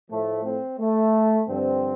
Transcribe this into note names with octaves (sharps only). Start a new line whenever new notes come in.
A2 F3 A3
C4
A3
G2 D3 F3 C4